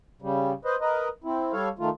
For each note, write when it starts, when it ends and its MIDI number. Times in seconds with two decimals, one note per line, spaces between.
0.22 0.52 49
0.22 0.52 55
0.65 0.76 71
0.65 0.76 72
0.65 0.76 75
0.81 1.08 70
0.81 1.08 71
0.81 1.08 75
1.24 1.52 60
1.24 1.52 64
1.53 1.68 55
1.53 1.68 69
1.53 1.68 73
1.53 1.68 77
1.79 1.89 51
1.79 1.89 57
1.79 1.89 65